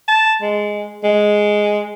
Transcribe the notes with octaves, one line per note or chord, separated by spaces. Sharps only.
A5
G#3
G#3